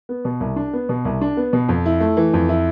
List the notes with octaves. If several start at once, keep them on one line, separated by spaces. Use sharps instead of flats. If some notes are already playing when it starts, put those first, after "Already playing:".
B3
B2
C2
D4
B3
B2
C2
D4
B3
B2
F2
E4
A3
E3
F2
E4